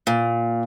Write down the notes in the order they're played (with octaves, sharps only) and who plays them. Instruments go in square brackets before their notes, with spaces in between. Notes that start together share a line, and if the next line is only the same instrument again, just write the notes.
[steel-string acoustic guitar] A#2